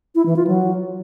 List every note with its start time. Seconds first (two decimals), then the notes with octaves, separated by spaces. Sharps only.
0.15 E4
0.26 E3
0.36 F4
0.47 F#3